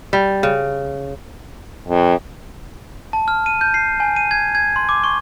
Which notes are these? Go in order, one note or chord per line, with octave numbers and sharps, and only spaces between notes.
G3
C#3
F2
A5
F6
D#7
G6
C7
G#5
D#7
G#6
G#6
C6
D6
C#6